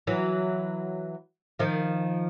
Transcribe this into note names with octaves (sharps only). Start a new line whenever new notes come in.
E3 F#3
D#3 F3